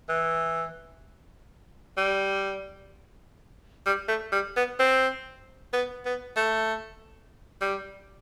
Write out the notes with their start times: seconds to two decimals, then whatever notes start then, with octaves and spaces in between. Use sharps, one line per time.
0.09 E3
1.97 G3
3.86 G3
4.08 A3
4.32 G3
4.57 B3
4.80 C4
5.73 B3
6.06 B3
6.37 A3
7.62 G3